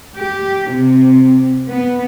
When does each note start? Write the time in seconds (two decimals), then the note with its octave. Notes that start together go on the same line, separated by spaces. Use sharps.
0.14 G4
0.69 C3
1.67 B3